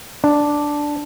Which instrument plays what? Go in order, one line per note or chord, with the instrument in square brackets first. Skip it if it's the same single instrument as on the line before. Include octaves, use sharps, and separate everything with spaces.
[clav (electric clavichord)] D4